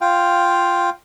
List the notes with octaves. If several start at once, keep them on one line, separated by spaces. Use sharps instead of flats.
F4 F5 G5